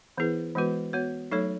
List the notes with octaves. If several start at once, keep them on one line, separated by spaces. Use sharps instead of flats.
E3 B3 E4 G#4 B4
E3 G#3 B3 F#4 B4
B3 F#4 C#5
F#3 A3 D#4 A4 C#5